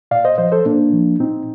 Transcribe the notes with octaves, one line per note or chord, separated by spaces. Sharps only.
A#2 D5 F5
C5 D#5
F3 C5 D#5
A4 C5
A#2 A#3 D4
F3
A#2 C4 D#4